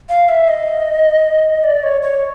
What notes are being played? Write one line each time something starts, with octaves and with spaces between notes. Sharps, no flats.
F5
E5
D#5
D5
C#5
C#5